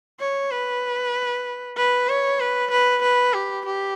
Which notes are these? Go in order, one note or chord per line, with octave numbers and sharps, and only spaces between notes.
C#5
B4
B4
C#5
B4
B4
B4
G4
G4